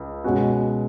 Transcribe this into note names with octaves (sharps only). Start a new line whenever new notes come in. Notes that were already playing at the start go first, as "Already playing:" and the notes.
Already playing: C#2 C#3
B2 G#3 C#4 F#4